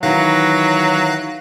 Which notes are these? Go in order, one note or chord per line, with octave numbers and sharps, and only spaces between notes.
D#3 E3 F#3 E4 F5 F#6 A#6